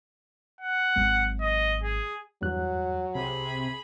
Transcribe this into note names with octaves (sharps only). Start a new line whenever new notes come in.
F#5
G#1 F#3
D#5
G#4
E2 G2 F#3 F#6
C2 C3 G#4 B5